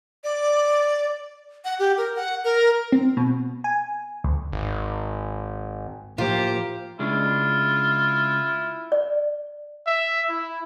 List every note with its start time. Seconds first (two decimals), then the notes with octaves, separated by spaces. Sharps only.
0.24 D5
1.65 F#5
1.79 G4
1.97 A#4
2.16 F#5
2.44 A#4
2.92 C4
3.17 B2
3.64 G#5
4.24 D2
4.53 G#1
6.18 A2 F3 A#3 F4 G4 C5
6.99 C#3 G#3 D4 E4 F4
8.92 D5
9.87 E5
10.30 E4